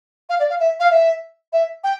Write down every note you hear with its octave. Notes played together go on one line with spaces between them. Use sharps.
F5
D5
F5
E5
F5
E5
E5
G5